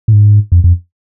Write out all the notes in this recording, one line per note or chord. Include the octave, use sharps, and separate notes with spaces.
A2
G#2
F2
F2